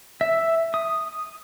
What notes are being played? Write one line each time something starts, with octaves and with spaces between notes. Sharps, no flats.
E5
D#6